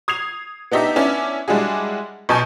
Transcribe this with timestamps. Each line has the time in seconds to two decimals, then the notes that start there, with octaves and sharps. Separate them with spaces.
0.08 D#6 G#6 C7 F7
0.72 B3 D4 D#4 G4 E5
0.96 B3 C#4 D4 E4
1.48 G3 G#3 D4 E4 F#4 G#4
2.29 B1 B2 G#5 A5 C#6 G6